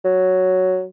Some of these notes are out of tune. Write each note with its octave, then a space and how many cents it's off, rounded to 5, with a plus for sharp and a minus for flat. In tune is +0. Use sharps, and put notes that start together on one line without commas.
F#3 +5